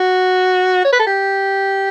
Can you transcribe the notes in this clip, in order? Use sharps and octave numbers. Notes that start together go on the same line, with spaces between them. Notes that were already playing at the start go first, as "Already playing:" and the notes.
Already playing: F#4
C#5
B4
A4
G4